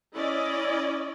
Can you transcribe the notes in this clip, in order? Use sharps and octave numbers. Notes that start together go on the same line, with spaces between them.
C#4 E4 D5 D#5